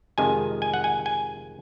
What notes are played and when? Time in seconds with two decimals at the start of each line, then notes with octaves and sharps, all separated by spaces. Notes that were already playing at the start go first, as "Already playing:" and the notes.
0.18 F2 C3 D#3 G#3 G#5
0.62 G#5
0.74 F#5
0.84 G#5
1.06 G#5